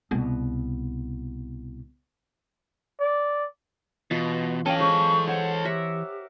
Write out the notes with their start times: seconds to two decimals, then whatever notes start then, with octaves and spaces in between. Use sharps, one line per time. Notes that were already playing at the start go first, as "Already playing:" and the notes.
0.11 C2 B2
3.00 D5
4.11 B2 E3 F4 D#5
4.66 C#4 A4 D#5 F5 G5
4.79 G#3 C5 C#6
5.27 C5 C#5 F#5
5.65 G4 A#4 E5 F#5